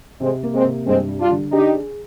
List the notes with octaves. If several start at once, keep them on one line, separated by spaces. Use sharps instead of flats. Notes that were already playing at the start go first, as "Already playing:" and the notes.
C3 G#3 C4
A#3
G#3 C4
C3
G2 G#3 C4
G3
D4 F4
D3
D4 D#4 G4
G#4